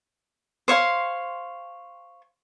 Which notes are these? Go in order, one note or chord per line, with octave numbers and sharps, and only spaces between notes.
C5 C#5 F5 C6